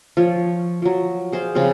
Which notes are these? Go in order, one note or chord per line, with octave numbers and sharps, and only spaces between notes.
F3 C#5
F3 F#3
G#4 C5 D5 F5
C#3 F3 C4 F4